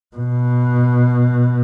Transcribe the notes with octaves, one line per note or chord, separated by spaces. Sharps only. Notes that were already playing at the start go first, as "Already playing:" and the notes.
B2